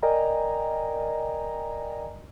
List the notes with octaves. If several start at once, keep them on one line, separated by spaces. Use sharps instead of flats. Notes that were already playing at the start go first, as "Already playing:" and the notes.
A#4 D5 D#5 G5 G#5 A#5